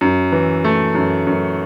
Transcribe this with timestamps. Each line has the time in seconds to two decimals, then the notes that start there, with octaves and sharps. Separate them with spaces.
0.01 F#2
0.32 E3
0.64 A3
0.95 F#2
1.27 F#2